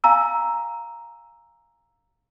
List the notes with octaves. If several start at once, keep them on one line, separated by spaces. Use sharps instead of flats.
F5 G#5 A#5 E6